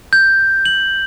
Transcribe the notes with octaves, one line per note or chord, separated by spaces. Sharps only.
G6
F#7